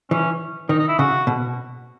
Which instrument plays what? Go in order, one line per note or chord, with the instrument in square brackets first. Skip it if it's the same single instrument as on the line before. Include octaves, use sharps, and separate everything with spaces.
[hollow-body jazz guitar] E3 [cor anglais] C#4
[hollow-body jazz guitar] D#3 [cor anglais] D#4
[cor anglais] D#4
E4
[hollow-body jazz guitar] C#3 [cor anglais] F#4
[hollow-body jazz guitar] B2